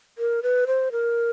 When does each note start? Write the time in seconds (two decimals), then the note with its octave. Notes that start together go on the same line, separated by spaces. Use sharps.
0.18 A#4
0.43 B4
0.67 C5
0.92 A#4